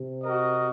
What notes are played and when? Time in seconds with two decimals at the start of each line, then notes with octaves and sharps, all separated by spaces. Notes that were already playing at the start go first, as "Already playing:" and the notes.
Already playing: C3
0.22 F#4 A#4 D#5